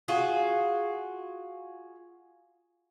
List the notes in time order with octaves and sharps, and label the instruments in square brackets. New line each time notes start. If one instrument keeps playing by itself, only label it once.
[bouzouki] F4 F#4 G#4